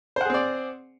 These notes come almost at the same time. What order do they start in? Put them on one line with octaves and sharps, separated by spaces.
C5 F#5 G#4 C4 D5